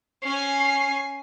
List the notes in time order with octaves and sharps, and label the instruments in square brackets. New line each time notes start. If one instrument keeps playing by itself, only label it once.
[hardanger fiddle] C#4 G#5 [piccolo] C7